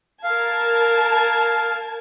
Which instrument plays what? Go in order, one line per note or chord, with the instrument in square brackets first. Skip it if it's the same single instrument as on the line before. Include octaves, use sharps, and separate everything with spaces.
[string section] A#4 A5 G#6 [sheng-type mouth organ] F5